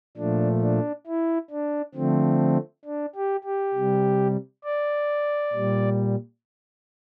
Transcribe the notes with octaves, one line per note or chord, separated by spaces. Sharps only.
A#2 F3 A3 D4
D4
E4
D4
D3 F3 A3 C4
D4
G4
G4
C3 G3
D5
A#2 G3